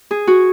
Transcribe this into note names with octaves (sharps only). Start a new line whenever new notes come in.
G#4
F#4